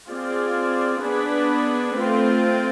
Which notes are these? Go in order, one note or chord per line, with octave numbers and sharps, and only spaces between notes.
C4 F4 G#4 D5
B3 D4 G#4 B4
A3 C4 F4